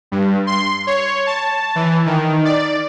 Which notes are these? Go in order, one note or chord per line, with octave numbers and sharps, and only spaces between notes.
G2
C6
C#5
A5
E3
D#3
D5